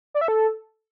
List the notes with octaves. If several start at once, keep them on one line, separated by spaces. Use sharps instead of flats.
D5
E5
A4